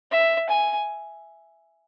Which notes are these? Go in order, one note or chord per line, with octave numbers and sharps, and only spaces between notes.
E5
G#5